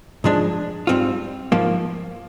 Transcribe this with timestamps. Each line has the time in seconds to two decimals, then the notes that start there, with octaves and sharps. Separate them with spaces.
0.24 G#2 F3 G#3 D4
0.87 G#2 G3 C4 F4
1.52 G#2 F3 A#3